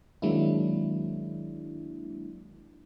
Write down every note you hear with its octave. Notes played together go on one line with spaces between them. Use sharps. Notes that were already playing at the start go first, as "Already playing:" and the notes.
D#3 F#3 G#3 A#3 D4 E4